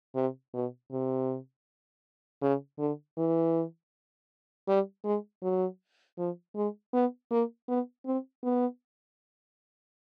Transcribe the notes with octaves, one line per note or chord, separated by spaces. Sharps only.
C3
B2
C3
C#3
D3
E3
G3
G#3
F#3
F3
G#3
B3
A#3
B3
C4
B3